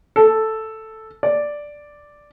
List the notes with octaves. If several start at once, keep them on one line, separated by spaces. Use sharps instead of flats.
A4
D5